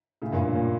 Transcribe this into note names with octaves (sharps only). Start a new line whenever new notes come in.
A2 C#3
G2 A#2
A#2